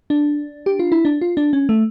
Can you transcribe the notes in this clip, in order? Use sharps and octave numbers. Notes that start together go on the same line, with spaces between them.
D4
G4
F4
E4
D4
F4
D4
C#4
A3